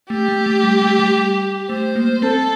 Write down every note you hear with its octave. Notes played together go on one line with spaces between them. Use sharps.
A3 G4
A3
A3
G3
A3
G3
A3 C5
A#3
C4 A4